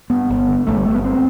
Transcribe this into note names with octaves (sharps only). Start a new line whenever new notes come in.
G2 B3
G1
D3
G1 A3
G3
G1 A3
B3
D2 C4